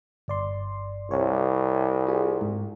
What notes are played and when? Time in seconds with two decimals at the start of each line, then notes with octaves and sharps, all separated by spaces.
0.28 G1 D5 C6
1.11 C2 C#5
2.07 F4 G#4
2.41 G#2